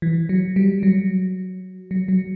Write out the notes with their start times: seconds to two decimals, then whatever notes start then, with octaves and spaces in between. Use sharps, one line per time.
0.02 E3
0.29 F#3
0.56 G3
0.83 F#3
1.91 F#3
2.08 F#3